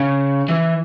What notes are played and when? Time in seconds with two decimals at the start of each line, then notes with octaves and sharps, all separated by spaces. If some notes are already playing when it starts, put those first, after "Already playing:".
Already playing: C#3
0.49 E3